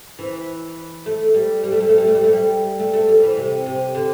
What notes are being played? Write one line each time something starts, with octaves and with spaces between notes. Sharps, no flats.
E3
A3
G3
G3
A3
G3
A3
G3
A3
G3
A3
G3
A3
A3
G3
E3
C3
C3
D3